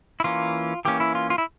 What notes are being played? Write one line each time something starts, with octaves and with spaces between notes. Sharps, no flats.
E4
E3 A#3 C#4 F4
E3 A#3 C#4 G4
E4
F4
F4
E4